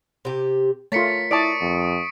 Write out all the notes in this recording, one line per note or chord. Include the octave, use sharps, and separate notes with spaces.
C3 G4
A3 F4 A#4 C#5 A6 B6 C#7
E4 D5 A5 C#6 D#6 D7
F2